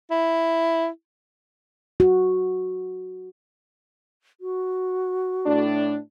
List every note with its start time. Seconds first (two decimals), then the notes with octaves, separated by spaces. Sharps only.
0.11 E4
2.00 F#4
4.41 F#4
5.46 A2 D4